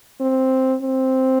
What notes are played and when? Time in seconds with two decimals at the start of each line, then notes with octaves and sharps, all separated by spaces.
0.20 C4
0.82 C4